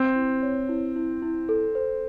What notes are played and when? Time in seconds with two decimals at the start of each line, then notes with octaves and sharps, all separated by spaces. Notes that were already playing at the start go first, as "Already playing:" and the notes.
Already playing: C4
0.15 E4
0.42 C#5
0.69 E4
0.96 E4
1.22 E4
1.49 A4
1.75 C5